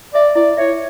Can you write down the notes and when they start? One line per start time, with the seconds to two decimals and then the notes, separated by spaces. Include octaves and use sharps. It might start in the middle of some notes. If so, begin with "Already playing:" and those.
0.14 D5 E5
0.35 E4 D5
0.57 C#5 E5